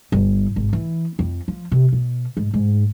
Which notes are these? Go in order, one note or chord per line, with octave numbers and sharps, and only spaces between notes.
G1
G#1
E3
F2
F3
C3
B2
G#2
G#2